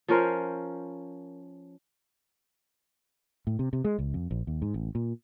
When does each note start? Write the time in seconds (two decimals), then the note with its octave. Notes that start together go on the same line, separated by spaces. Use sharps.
0.08 F3 C#4 A#4 C5
3.47 A2
3.59 C3
3.73 C3
3.84 G#3
3.99 C#2
4.14 F2
4.31 A#1
4.47 D#2
4.62 G#2
4.74 A1
4.95 A#2